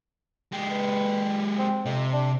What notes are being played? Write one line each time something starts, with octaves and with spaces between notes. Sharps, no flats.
G#3 G4
B4
C4
F2 C3
D4